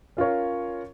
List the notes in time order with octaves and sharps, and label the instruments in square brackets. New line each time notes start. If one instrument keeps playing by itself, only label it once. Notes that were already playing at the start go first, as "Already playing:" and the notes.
[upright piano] C#4 F4 A#4 C#5